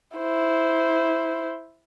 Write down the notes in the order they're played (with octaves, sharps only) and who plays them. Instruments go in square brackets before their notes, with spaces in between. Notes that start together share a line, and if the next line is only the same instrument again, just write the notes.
[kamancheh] E4 C5